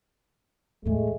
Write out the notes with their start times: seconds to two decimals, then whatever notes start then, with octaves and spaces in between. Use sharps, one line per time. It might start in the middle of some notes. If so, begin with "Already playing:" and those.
0.85 E2 A2 G#3 A3